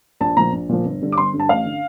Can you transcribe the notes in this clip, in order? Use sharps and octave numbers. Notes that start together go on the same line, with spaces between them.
A#1 A5
A#2 F3 A#5
A#1
A#2 F3
G1
G2 D3
D6
G1 C6
G2 D3
A5
A1 F5
D3